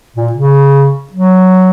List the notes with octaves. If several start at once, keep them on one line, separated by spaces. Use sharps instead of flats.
A#2
C#3
F#3